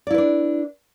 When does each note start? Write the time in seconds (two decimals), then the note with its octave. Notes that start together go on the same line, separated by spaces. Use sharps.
0.07 D5
0.11 E4
0.14 B4
0.18 D4